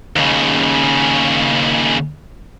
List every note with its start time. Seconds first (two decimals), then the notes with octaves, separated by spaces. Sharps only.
0.16 D#2 C#3